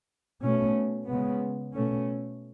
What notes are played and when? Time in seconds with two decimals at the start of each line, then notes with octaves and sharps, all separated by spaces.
0.42 B2 A3 C#4
1.07 C#3 G#3 B3
1.74 B2 A3 C#4